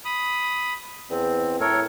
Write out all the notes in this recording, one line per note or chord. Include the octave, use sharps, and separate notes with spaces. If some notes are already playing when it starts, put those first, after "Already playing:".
B5 D#6
E2 C4
A2 A4 A#4 C#5